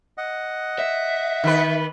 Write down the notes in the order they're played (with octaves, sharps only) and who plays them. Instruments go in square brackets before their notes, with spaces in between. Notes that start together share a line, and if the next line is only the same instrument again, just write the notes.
[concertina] D#5 F#5
[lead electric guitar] E5
[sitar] D#3 B4